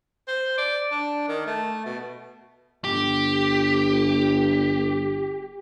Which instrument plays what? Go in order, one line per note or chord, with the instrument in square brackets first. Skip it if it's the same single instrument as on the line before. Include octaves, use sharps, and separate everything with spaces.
[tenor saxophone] C5
D5
D4
D#3
A3
B2
[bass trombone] G1 [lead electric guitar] G4